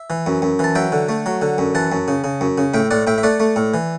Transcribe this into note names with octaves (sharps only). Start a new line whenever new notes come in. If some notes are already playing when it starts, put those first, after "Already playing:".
Already playing: E5
E3
F#2
F#2
E3 A5
F#3 E5 G5
D3
A3
F#3
D3
F#2
E3 F#5 A5
F#2
C#3
C#3
F#2
C#3
A2 E5 G5
A2 D5 F#5
A2 E5 G5
E5
A3 D5 F#5
A3
A2
E3